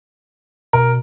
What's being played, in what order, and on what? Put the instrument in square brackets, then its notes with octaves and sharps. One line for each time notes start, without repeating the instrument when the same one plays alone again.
[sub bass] B2 [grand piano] A#4